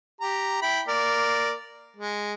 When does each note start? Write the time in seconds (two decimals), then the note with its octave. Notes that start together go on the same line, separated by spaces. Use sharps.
0.21 G4 A#5
0.62 E4 G5 B5
0.88 A#3 A#4 D5
1.97 G#3